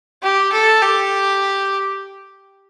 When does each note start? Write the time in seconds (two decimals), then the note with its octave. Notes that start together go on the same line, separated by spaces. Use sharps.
0.23 G4
0.53 A4
0.82 G4